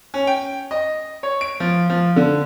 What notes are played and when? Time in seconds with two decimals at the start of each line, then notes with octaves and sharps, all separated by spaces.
0.14 C#4
0.27 G5
0.71 D#5
1.23 C#5
1.41 D7
1.60 F3
1.90 F3
2.16 D3